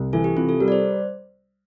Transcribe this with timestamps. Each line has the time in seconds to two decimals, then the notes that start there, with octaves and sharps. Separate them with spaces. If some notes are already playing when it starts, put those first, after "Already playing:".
Already playing: C2
0.13 E3 A4
0.24 G4
0.36 C3 F4
0.49 A4
0.60 G3 A#4
0.68 D5
0.72 C5